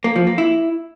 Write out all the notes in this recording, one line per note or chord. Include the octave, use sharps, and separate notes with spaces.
A#3
F3
A#3
E4